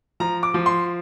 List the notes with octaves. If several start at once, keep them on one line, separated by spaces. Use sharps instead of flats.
F3 A#5
D6
F3
C6